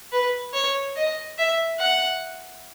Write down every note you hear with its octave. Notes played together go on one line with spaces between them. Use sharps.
B4
C#5
D#5
E5
F#5